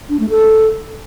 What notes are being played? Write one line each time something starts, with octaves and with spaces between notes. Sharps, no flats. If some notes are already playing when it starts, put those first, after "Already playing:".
D4
A3
A4